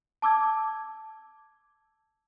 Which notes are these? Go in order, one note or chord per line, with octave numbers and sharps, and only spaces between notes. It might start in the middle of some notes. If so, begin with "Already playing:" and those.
A5 D6 E6 G#6